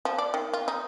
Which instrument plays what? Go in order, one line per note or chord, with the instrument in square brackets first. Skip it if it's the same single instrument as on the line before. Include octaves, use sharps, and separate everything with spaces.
[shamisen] F3
D5
D#3
F4
D#4